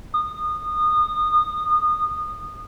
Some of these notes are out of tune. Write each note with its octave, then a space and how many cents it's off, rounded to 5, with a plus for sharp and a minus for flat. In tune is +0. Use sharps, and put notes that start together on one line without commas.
D#6 -25